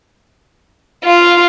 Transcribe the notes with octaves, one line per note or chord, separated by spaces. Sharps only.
F4